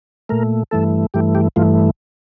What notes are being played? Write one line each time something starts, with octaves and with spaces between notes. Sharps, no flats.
A#2 A3 A#4
G2 E3 A3 A4
G2 E3 A3 G4
G4
G2 E3 A3 F4